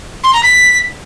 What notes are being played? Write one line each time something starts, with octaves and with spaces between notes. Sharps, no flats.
C6
A#5
B6